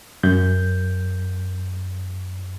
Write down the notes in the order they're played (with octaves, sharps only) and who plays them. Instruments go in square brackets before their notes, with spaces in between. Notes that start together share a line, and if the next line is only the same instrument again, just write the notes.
[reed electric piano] F#2 G6